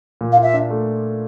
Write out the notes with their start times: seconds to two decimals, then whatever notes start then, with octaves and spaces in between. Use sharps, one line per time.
0.21 A#2
0.32 F5
0.37 F4
0.42 E5
0.54 D4
0.71 A3